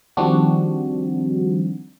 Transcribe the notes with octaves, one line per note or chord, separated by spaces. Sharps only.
D#3 F3 G3 C4 D4 F#4